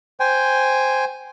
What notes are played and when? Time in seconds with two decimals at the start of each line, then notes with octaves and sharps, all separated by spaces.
0.20 C5 G5 G#5